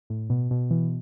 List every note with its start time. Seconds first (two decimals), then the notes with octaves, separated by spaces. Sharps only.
0.10 A2
0.30 B2
0.51 B2
0.71 E3